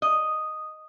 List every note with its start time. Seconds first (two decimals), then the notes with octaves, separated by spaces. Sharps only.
0.02 D#5